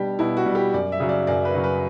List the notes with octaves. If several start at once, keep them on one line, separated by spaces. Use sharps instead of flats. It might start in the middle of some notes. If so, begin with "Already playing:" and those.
Already playing: B2 G3 D4 G4
B2 E4
F#4
G3
G4
F#2 D5
E5
C#3 F#3
D5
F#2 D5
B4
C#3 F#3
B4